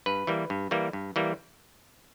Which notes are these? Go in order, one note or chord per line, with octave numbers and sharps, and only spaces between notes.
G2 B4
E3 G3 A#3
G2
E3 G3 A#3
G2
E3 G3 A#3